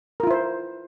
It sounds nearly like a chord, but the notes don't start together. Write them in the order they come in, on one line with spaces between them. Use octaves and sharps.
A#4 F4 E4 C5